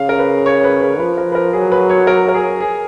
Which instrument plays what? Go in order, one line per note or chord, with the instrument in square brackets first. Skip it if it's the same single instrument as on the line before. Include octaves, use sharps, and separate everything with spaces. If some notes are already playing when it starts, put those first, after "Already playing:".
Already playing: [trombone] C#3 [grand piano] F5
[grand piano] A#4
B4
C#5
B4
B4
[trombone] F3 [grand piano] B4
[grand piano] A#4
B4
A#4
[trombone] F#3 [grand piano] G#4
[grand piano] B4
C#5
A#4
A#4
G#4
G#4